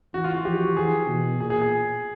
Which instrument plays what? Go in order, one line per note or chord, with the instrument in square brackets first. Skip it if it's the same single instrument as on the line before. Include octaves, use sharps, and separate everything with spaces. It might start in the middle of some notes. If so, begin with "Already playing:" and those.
[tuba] E3 [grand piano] F#4
[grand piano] F4
F#4
[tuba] F3 [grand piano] G4
[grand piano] F#4
[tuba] E3 [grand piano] G#4
[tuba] B2
[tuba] A#2 [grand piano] G#4
[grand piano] G#4
G#4